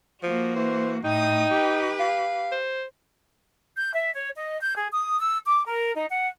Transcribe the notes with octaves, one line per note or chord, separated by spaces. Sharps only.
F3 A#3 F#4
E3 C5
A2 D#4 G5 D#6
G4 B4
F5
C5
G6
E5
C#5
D#5
G6
G#4
D#6
E6
D6
A#4
D#4
F#5